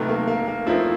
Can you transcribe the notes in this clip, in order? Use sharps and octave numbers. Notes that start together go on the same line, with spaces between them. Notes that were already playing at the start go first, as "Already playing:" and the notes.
Already playing: C3 D#3 F#3 A3 B3
A#3
A#3
A#3
F3 A3 C4 D#4 E4